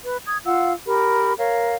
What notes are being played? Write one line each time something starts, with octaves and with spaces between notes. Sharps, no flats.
B4
D#6 G#6
F4 F5 F#5 E6
G4 A#4 B5
A#4 C#5 F5